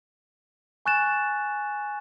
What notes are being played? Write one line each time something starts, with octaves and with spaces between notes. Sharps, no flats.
G#5 C#6 F#6 A6 E7